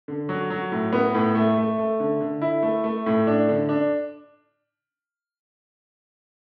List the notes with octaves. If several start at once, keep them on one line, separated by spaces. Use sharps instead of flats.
D3
F#3
F#3
A2
B3
A2
A3
A3
A3
D3
D3
E4
A3
A3
A2
D4
D3
D4